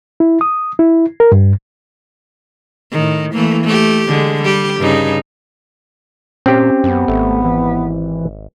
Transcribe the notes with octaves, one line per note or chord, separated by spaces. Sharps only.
E4
D#6
E4
A#4
G2
A2 D#3
E3 A3 A#3
A3 G4
D3 G#3
G3 G4
G2 C#3 D#4
A#2 C4 C#4 G4
F#2 B3
G#1 A3
E3